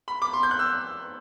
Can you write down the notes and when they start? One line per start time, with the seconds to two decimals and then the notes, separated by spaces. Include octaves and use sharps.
0.08 B5
0.22 D6
0.33 C6
0.43 G6
0.51 F#6
0.59 E6